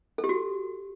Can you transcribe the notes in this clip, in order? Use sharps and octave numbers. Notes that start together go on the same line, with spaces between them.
A4
G4
F#4